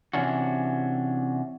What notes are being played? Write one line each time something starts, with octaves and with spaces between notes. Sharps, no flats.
C3 E3 C#4 D4 F#4